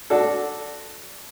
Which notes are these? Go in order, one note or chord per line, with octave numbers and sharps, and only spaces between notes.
D4 F#4 A4